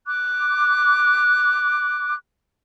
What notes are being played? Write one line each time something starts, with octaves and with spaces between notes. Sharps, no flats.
D6 F#6